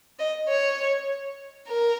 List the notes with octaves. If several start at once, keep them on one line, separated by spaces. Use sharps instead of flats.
D#5
C#5
A#4